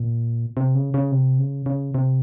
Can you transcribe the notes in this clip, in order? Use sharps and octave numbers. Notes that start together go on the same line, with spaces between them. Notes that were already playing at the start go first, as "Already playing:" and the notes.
Already playing: A#2
C3
C#3
C#3
C3
C#3
C#3
C3